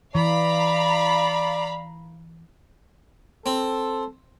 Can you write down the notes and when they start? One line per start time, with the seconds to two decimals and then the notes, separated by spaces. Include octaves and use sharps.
0.15 E3 D5 F5 A#5 B5
3.46 C4 A4